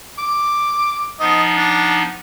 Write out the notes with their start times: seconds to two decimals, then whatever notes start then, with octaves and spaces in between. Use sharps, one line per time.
0.18 D6
1.20 F3 B3 D#4 D#5
1.58 D4